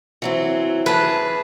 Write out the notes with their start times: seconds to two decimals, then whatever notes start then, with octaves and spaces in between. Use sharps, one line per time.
0.22 E3 F#3 C4
0.86 E3 G#4 B4 A5